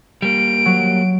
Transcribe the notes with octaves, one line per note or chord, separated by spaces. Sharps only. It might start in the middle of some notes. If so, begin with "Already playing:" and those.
G3 A#3 D7
F#3